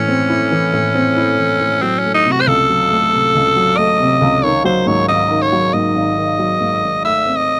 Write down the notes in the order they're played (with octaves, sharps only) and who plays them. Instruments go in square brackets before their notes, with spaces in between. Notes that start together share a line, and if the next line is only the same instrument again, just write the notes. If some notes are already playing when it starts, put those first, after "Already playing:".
Already playing: [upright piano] A2 E3 [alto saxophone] C#4
[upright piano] C4
E4
E3
A2
C4
E4
E3
A2
[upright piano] F#3 [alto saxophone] C4
[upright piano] A3 [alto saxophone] C#4
[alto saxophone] D#4
[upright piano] C3
[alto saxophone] F#4
C5
[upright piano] C#2 [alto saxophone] A4
[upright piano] F#3
A3
C3
C#2
F#3
[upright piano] A3 [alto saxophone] D#5
[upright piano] C3
C#2
[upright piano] D#3 [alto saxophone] C#5
[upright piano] F#3 [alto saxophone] C5
[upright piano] G#2 [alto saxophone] C#5
[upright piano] G#1 [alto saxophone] D#5
[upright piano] D#3
[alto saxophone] C#5
[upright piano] F#3
[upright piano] G#2 [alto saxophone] D#5
[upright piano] G#1
D#3
F#3
G#2
G#1
[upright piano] A3 [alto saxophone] E5
[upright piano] C4
[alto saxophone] D#5